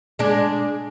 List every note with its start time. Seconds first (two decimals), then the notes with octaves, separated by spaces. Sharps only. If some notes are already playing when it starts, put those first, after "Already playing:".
0.19 G#3 D4